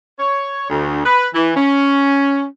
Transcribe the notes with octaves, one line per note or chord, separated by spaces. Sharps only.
C#5
D2
B4
E3
C#4